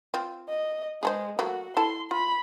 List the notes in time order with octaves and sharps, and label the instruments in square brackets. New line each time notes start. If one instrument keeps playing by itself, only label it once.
[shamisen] C4 F4
[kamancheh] D#5
[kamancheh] G#3 [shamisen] G#4 A4 C5
[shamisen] F#3 A3 A#3 [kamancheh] F#4
[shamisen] E4 A4 A5 [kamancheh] C6
[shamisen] F4 [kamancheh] B5